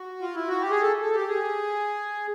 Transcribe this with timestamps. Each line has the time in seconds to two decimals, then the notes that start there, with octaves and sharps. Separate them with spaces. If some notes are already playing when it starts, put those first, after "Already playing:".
Already playing: F#4
0.21 F4
0.35 E4
0.48 F#4
0.61 G4
0.71 G#4
0.82 A4
1.02 A4
1.15 G4
1.28 G#4